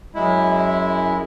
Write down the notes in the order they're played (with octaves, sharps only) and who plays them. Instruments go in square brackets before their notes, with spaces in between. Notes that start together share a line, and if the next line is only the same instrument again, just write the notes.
[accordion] F#2 G#3 E4